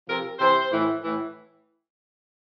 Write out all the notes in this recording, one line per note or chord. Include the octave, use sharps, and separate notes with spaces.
C3 F3 A#4
C3 E3 C5
A2 E3
A2 E3